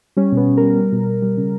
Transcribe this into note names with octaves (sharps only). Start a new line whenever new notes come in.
G3 C#4
B2 B3
B2
G3 A#4
G3
B2
B2
G3
C#3